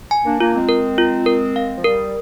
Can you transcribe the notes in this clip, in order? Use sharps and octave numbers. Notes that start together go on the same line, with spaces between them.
G#5
A#3 D4
A#3 D4 F4
G#3 C4
A#4
F4
A#4
F5
F3
G3 A#4